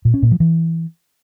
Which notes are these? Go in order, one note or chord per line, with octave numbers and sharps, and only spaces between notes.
A#2
C#4
A#2
F3
E3